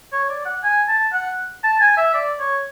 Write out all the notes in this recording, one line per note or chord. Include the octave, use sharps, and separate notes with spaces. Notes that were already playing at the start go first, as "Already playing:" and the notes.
C#5
D5
F#5
G#5
A5
F#5
A5
G#5
E5
D5
C#5